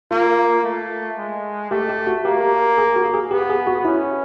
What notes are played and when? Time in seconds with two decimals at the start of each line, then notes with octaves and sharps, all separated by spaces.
0.11 A#3 F4
0.64 A3
1.18 G#3
1.71 A3 G4
1.89 G4
2.07 F#4
2.25 A#3 G4
2.78 G#4
2.96 F#4
3.14 G#4
3.31 B3 G4
3.50 G#4
3.67 F#4
3.85 C#4 E4